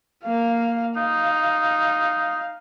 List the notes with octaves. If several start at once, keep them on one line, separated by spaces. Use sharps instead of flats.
A#3 F5
D#4 F5